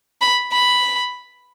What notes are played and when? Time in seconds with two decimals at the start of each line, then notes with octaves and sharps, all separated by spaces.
0.21 B5
0.52 B5